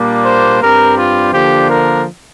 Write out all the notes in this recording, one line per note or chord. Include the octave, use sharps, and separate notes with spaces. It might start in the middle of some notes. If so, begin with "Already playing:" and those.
Already playing: A#2 G3 A#3 D4
C5
G2 G3 C4 A#4
F4
D3 F3 A#3 D4 G4
A#4